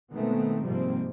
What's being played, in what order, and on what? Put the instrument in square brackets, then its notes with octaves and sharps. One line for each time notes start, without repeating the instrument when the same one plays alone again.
[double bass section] B2 D#3 G#3 A3 B3 C4
G#2 C3 F3 G3 A#3 C4